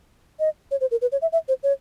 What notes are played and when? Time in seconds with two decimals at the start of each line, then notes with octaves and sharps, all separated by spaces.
0.39 D#5
0.71 C#5
0.81 C5
0.91 A#4
1.01 B4
1.12 C#5
1.22 E5
1.32 E5
1.48 C5
1.63 C#5